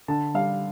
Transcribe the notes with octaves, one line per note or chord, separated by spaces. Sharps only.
D3 A5
G3 F5